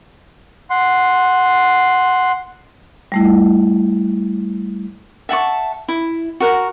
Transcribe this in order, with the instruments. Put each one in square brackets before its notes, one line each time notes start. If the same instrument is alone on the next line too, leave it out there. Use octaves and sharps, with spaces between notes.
[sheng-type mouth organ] F#5 C6
[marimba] G3 A3 E4
[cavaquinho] E5 F#5 A5 C#6
E4
F#4 A#4 F#5